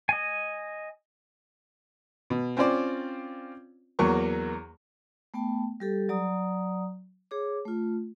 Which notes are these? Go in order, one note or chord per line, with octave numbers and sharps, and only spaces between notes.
D#5 G#5
B2
C4 C#4 F4 C5 D5
E2 F#3 A#3 C#6
A3 B3 G5 A5
G3 G4 A4
F#3 D5 A#5 D#6
G#4 C#5 D6
A3 F4